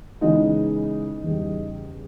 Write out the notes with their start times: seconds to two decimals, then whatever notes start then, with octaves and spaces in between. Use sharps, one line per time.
0.21 C#3 E3 G#3 B3 D#4 D#5
1.24 E2 C#3 G3